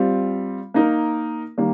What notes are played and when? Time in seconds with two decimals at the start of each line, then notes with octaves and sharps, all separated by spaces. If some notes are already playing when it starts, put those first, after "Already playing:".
Already playing: G3 C4 F4
0.74 A#3 D#4 A#4
1.58 D#3 G3 A#3